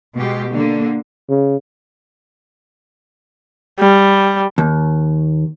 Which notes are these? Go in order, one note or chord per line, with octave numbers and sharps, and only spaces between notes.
B2 G#3 G4
D3 A#3
C#3
G3
D#2